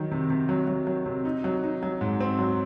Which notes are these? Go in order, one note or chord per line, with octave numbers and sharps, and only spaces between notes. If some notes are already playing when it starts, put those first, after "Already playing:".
Already playing: D#3 F#3
C3
C3
F#3
F#3
F#3
C3
D#4
F#3
D#4
F#3
G#2
C4
F#3